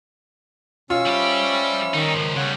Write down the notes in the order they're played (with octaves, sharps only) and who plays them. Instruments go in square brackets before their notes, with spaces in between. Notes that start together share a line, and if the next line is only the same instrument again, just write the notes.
[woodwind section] B2 [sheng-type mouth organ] C#4 C#6 E6 [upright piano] F4
[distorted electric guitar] G3 G4 [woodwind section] C5 E5 B5
[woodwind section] D#3 [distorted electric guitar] G3 D#4
[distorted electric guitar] C#2 F3
[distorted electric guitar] C#3 G3 [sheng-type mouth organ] C#5 F#5